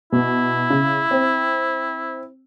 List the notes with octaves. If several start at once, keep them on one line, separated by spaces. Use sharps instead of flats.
B2 E4
C#3
C4